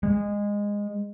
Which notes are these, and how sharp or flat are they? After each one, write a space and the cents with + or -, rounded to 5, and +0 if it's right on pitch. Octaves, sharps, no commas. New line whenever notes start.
G#3 -20